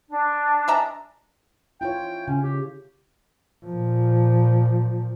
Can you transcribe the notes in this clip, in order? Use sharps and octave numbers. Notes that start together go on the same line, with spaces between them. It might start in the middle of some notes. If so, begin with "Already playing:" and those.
D4
G#3 E5 A#5
E4 F4 C#5 G5
C#3 C#4
G4
A#2 F3